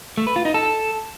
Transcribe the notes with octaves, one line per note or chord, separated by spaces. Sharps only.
A3
B4
F4
D#4
A4